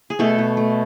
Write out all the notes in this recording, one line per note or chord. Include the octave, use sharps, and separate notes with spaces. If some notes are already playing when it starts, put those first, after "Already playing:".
G#4
B2 A3 A4
B2
A3